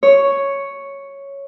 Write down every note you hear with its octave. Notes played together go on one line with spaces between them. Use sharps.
C#5